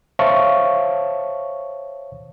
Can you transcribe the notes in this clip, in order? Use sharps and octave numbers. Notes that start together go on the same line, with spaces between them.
C5 C#5 E5 F5 A5 C#6